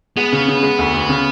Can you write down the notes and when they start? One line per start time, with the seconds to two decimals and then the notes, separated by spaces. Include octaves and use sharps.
0.17 G#3 B3
0.33 C#3
0.48 C#3
0.63 G#3
0.78 D2
0.94 D2
1.09 C#3